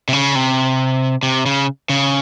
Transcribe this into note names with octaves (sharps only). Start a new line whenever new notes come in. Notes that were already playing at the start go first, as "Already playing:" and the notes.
C3
C#3
C3
C3
C#3
C#3